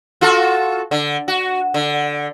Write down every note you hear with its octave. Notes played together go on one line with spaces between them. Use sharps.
F4 F#4 A4
D3
F#4
D3